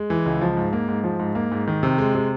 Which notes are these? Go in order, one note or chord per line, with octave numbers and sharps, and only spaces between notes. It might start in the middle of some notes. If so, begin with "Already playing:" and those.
Already playing: G#3
E3
C#2
F3
G#2
A#3
G#2
F3
G#2
A#3
G#2
D#3
C3
G#3
C3